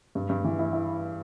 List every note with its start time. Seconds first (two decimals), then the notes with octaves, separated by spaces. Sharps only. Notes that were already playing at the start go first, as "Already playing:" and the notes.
0.15 G2
0.29 G2
0.44 E3
0.59 E4
0.73 E4